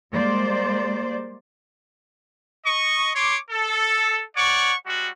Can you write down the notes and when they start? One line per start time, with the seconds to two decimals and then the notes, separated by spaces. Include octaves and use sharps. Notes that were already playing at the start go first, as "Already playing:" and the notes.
0.11 G3 G#3 A#3 C5 D5
2.66 D#5 C#6
3.15 C#5 C6 D6
3.51 A4
4.36 C#5 D5 F#5 C#6
4.85 G3 G#3 F#4